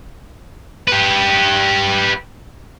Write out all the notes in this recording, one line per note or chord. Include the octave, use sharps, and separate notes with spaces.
G4 B4